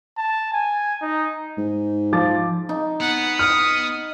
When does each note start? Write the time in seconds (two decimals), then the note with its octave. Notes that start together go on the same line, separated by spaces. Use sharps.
0.17 A5
0.53 G#5
1.01 D#4
1.58 G#2
2.13 F3 D6 A6
2.69 D#4
3.00 B3 F#5
3.39 D#6 F6